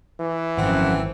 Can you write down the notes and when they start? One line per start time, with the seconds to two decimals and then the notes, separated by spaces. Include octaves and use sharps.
0.20 E3
0.57 G#1 F#2 F3 C4 F#5